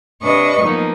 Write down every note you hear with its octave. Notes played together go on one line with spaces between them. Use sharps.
C3 D4 B4 D#5 C#6
F3 A#3 B3 D#4